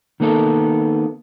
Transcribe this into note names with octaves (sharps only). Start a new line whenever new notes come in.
D#3 A#3 B3 A4